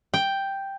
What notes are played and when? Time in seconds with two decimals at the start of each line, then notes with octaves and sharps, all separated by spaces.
0.14 G5